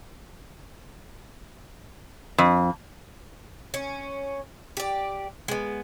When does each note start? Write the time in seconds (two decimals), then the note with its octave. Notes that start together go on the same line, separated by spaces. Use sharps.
2.38 F2
3.74 C#4
4.77 G4 D5
5.48 G#3 B3